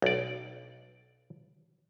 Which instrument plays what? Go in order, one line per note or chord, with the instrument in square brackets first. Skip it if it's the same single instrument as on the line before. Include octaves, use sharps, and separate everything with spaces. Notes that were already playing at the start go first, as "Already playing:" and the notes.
[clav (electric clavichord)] B1 D5